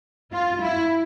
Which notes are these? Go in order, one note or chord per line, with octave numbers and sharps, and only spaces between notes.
F4
E4